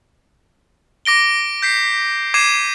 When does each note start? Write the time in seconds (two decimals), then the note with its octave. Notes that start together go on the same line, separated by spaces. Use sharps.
1.05 D6 A#6 D7 G7
1.62 G6 B6 C7
2.34 D6 G#6 C7 D#7 E7